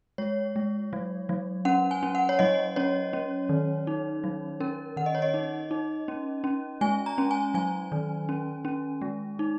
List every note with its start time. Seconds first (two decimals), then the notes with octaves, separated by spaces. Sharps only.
0.18 G#3 C#5
0.56 G#3
0.93 F#3
1.29 F#3
1.65 C#4 F#5
1.91 G#5
2.03 C#4
2.15 F#5
2.29 C#5
2.39 F#3 D#5
2.76 C#4 C#5
3.13 C#4
3.49 D#3
3.87 D#4
4.24 F#3
4.60 C#4 A#4
4.97 D#3 F#5
5.06 D#5
5.15 C#5
5.22 D#5
5.34 D#4
5.71 D#4
6.08 C#4
6.44 C#4
6.81 G#3 G#5
7.06 A#5
7.18 C#4
7.31 G#5
7.54 F#3 G#5
7.92 D#3
8.29 C#4
8.65 C#4
9.02 G#3
9.39 D#4